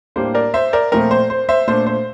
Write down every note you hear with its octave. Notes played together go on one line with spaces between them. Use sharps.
A2 G3 A#3 D4 C5
A#4 D5
C5 E5
A#4 D5
A#2 F3 A3 C4 A#4
C5
C5
C5 E5
A#2 A3 D4 C5
C5